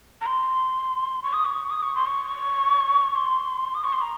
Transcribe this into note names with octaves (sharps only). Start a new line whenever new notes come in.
A#5
C6
C#6
D#6
C#6
D#6
C#6
C6
C#6
C6
D#6
C#6
C6
A#5